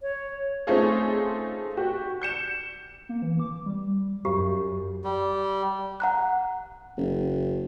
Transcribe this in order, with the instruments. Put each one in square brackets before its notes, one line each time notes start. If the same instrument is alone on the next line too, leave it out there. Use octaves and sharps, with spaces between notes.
[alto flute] C#5
[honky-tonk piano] A3 C4 C#4 D#4 F4 G#4
F#4 G4
G6 C#7 E7
[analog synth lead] A#3
E3
D6
G3
[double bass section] F#2 [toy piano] G4
[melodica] G3
[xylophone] F#5 A#5 F#6
[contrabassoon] F#1